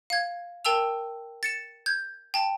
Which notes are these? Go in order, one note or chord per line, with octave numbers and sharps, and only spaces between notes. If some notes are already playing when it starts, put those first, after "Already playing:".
F5 G#6
A#4 G5 A5 E6 F7
A6 C#7 E7
G6 G#6
G5 A5